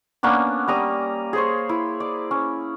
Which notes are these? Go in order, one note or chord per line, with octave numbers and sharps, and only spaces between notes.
A#3 B3 C#4 D4
G3 A#5 D#6
G#4 C5 C#5
E4
D5
C#4